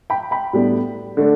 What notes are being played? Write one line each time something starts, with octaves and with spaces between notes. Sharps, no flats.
G5 B5
G5 B5
A2 G3 B3 D4
D3 A3 D4